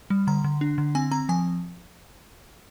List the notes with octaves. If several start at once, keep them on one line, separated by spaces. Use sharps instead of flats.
G3
D3 A#5
D3
D4
D3
C4 G#5
C4 A#5
F3 G#5